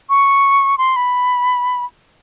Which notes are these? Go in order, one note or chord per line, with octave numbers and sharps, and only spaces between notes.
C#6
C6
B5